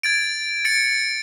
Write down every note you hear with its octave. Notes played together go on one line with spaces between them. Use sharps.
G#6 A6 D7
A6 C#7 D7